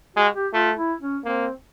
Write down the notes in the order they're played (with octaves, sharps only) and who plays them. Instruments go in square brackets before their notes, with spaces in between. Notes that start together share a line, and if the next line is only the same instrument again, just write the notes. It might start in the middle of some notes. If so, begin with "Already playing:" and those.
[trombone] G#3 [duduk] F#4
[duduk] G4
[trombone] A3 [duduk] F4
[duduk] E4
C#4
[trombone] A#3 [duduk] C4